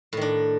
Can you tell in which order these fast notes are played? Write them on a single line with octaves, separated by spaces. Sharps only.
A2 D#3 D4